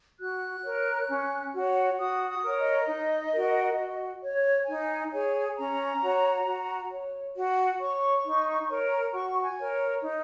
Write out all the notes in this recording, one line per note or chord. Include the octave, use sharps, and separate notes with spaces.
F#4 F#6
A#4 C#5
C#4
F#4 C#5
F#4 D#6
D#6
A#4 C#5
D#5
D#4
F#4 A#4
F#4
C#5
D#4 G#5
G#4 C#5 G#5
C#4 A#5
F#4 C#5
F#4
C#5
F#4
C#5 C#6
D#4
A#4 C#5
F#4 C#6
G#5
A#4 C#5
D#4